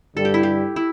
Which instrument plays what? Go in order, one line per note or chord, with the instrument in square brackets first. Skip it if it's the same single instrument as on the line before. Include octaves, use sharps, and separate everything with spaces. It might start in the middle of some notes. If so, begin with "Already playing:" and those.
[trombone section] G2 D3 G3 [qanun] A4
[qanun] G4
E4
G4
E4